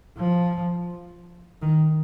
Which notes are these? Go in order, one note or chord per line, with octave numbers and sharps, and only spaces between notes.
F3
D#3